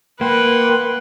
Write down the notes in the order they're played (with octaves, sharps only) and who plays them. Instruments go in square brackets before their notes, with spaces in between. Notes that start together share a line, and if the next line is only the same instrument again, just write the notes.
[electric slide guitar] A#3 [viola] B4 [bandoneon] F#5 G5 C6